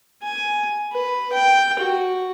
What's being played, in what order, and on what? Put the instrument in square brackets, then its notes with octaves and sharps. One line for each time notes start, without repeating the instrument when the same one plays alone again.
[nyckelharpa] G#5
B4
G5
F#4